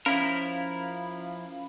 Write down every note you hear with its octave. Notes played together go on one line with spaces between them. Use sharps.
F3 C#4 E4 A#4 F5 B5